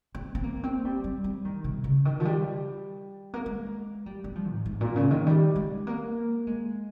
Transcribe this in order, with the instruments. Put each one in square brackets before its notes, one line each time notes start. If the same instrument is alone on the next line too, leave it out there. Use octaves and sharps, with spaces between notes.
[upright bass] C4
C4
A#3
C4
G3
G3
G3
D#3
C3
C#3
D#3
F3
G3
A#3
G#3
G3
G3
F3
G#2
G#2
A#2
C#3
D#3
G3
G#3
A#3
G#3